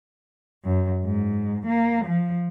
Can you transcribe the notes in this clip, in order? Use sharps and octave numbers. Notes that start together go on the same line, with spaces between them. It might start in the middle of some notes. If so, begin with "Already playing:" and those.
F#2
G#2
A#3
F3